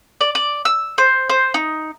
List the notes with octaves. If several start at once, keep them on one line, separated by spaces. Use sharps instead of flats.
D5
D5
E6
C5
C5
D#4